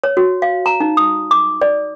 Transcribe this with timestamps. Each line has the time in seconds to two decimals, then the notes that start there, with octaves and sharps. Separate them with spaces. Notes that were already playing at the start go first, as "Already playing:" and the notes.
0.04 C#5
0.17 F#4
0.42 F5
0.66 A#5
0.80 D#4
0.97 D#6
1.31 D6
1.61 D5